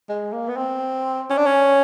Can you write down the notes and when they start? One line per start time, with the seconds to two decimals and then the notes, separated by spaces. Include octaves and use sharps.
0.09 G#3
0.33 A#3
0.48 B3
0.57 C4
1.30 C#4
1.38 D4
1.46 C#4